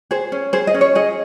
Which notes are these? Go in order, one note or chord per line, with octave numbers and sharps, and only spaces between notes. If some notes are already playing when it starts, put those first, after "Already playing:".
G#4 C5
C#4
G#4 C5
D#5
C#4
C#5
G#4 D#5